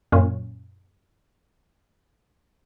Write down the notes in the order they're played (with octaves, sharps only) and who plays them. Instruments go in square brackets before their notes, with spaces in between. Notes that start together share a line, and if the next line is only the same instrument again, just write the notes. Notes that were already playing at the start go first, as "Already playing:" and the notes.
[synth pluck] F#2 A#2 C#4 F4